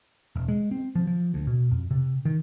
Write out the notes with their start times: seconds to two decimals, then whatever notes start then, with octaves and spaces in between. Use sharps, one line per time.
0.36 E1
0.48 G#3
0.71 C4
0.95 F3
1.07 F3
1.34 D2
1.47 B2
1.71 F2
1.91 C3
2.25 D#3